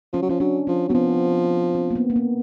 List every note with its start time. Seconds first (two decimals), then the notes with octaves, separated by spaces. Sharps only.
0.13 F3 C#4
0.22 F#3
0.29 F3 C#4
0.40 F#3 D4
0.67 F3 C#4
0.88 F#3 B3
0.94 F3 C4
1.75 C4
1.91 A#3
1.96 B3
2.10 A#3
2.16 B3